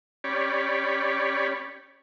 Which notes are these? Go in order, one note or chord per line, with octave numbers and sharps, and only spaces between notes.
C#4 G4 C#5 D5 B5